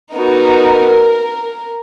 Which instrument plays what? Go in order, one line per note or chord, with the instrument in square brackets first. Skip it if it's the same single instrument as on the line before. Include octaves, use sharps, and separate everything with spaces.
[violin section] B3 D#4 F#4 A#4